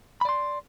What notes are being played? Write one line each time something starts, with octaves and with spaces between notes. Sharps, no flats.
D5 B5 C6